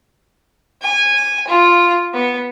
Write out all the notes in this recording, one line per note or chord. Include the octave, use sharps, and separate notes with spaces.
G#5
F4
B3